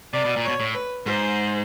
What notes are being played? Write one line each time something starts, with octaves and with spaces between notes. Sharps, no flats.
C3 D5
B2
A#2
B2 C#5
A2
B4
G#2 C5